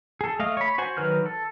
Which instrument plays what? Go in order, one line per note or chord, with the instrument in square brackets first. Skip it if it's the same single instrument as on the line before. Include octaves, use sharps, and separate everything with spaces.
[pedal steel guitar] G#4 A4
A3 D#5 F5
C#5 B5
F#4 C5 G#5
D#3 F#3 B4 F6 G6
A4